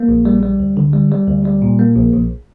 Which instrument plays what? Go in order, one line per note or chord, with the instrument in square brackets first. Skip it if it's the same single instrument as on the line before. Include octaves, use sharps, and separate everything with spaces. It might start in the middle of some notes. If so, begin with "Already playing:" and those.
Already playing: [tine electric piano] A#3
A#1
G3
G3
D2
D3
G3
G3
D2
G3
A#2
A#3
A#1
A#1